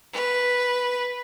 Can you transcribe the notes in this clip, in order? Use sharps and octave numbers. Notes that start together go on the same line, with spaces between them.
B4